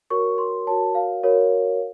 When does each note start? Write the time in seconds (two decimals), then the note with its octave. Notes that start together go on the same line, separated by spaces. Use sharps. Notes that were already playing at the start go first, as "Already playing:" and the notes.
0.10 F#4 A#4 C#5 C#6
0.38 C6
0.67 F#4 A#4 C#5 A5
0.95 F5
1.23 F#4 A#4 C#5